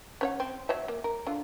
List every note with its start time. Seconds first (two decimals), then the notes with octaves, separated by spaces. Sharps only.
0.21 C#4 C#5 F#5
0.40 C4
0.69 F#3 C#5 E5
0.88 A#3
1.04 A#4
1.27 D3 F4